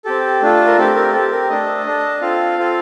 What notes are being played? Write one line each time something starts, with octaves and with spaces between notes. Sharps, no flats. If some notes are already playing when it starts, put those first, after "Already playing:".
C4 G4 A4
A3 D4 F4 A4
A#4
A3 C4 G4 A4
A#4
C4 G4 A4
A#4
A3 D4 A4 D#5
D4 A4
C4 F4 A4 F5
C4 F4 A4